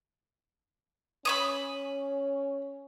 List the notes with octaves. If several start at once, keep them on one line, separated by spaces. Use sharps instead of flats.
C#4 B5 C#6 D#6